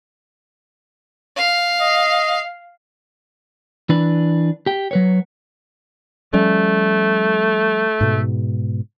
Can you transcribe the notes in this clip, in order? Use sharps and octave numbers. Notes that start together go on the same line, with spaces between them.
F5
D#5
E3 D4 B4
G4 G5
F#3 B4 C#5
F3 G3 A3 C#4
G#2 B2